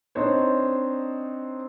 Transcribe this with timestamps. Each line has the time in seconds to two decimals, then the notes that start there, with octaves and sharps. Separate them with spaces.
0.15 C4 D4 D#4 C5 C#5